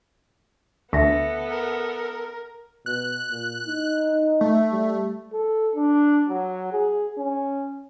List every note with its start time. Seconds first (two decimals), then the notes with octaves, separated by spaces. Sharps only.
0.93 D2 B3 A4 E5 A#6 B6
1.50 A#4
2.86 B2 F#6
3.31 A#2
3.67 D#4
4.41 A3
4.71 G3
5.32 A4
5.76 D4
6.29 F#3
6.73 G#4
7.18 C#4